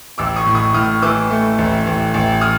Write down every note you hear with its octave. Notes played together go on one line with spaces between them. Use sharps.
A1 D6 E6
C#6 D#6
A2
C#6 D#6
A2 D#6 F6
E3 D6 E6
A3
A1
A1
A1
D#6 F6